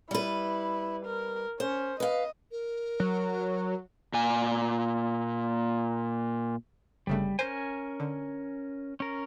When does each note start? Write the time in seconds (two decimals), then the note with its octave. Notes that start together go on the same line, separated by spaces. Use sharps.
0.11 G3 E4 B4
1.06 A#4
1.60 C#4 C5
2.00 B4 D#5 F5
2.51 A#4
3.00 F#3
4.14 A#2 G#5
7.07 G1 C#3 G3 A3
7.39 C#4 A#4 C5 G#5
8.00 D3
9.00 C#4 A#4